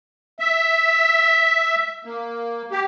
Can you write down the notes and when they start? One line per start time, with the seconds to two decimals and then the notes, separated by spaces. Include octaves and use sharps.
0.40 E5
2.05 A#3
2.71 G4